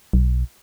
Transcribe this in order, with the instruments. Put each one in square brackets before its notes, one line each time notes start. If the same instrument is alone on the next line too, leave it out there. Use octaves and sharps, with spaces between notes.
[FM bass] B1